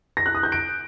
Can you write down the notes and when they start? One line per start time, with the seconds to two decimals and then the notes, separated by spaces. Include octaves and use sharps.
0.17 A#6
0.26 F#6
0.35 D#6
0.43 G6
0.52 D7